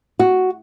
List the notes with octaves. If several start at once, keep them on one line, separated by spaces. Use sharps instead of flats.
F#4